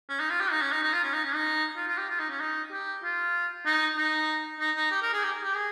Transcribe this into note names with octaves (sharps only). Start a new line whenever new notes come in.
C#4
D#4
F4
G4
D#4
C#4
D#4
D#4
F4
C#4
D#4
C#4
D#4
F4
F4
G4
F4
D#4
C#4
D#4
G4
F4
D#4
D#4
D#4
D#4
G4
A#4
G#4
G4
G4
G#4